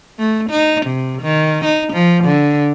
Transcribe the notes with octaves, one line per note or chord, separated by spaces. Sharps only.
A3
D#4
C3
D#3
D#4
F3
D3